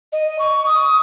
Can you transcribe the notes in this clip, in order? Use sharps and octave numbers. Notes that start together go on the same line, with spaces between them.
D#5
C#6
D#6